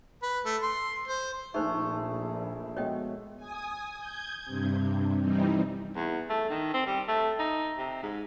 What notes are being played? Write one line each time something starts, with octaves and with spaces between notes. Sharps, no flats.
B4
A3
C6
C5
A#1 A3 D#4 G#4 C5
B2 G#3 C#5 D#5 G5
G#5 D#6
G6 G#6
G2 C3
E3 G3 C4 D#4
E2
A3
D#3
C4
G3
A3
D#4
C3
G#2